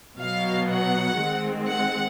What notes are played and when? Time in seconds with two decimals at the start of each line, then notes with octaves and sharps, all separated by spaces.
0.20 B2 F#3 B3 F5
0.70 F#5
1.20 D#3 G#3 C4
1.68 F#5